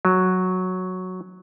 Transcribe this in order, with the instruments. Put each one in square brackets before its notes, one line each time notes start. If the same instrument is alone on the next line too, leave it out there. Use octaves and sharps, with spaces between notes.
[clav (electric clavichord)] F#3